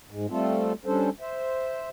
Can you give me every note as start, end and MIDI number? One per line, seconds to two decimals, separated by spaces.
0.11 0.26 44
0.11 0.26 56
0.30 0.73 55
0.30 0.73 57
0.30 0.73 60
0.30 0.73 65
0.30 0.73 69
0.85 1.10 55
0.85 1.10 61
0.85 1.10 62
0.85 1.10 69
0.85 1.10 72
1.20 1.89 72
1.20 1.89 76